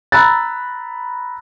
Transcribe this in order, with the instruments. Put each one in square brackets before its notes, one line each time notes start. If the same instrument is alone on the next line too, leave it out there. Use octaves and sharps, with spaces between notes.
[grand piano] A#5 B5 E6 F#6 A6